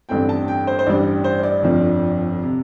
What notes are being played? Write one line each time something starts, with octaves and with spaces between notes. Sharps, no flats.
A1 G2 D3 A3 C4 G5
A5
G5
C5
C5
A1 G2 G3 D4 D5
C5
D5
G1 F2 F3 D4
C3